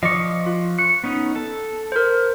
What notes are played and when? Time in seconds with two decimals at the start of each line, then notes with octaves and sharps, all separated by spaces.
0.03 F3 D5 D#5 C#6
0.46 F4
0.78 C#6 F#6
1.04 B3 C#4 D#4
1.36 A4
1.92 A#4 C5